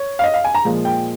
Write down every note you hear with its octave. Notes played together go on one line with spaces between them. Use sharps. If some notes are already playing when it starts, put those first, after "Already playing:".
Already playing: C#5
F5
D#5
F5
G#5
A#5
A#2 F3 G#3
G5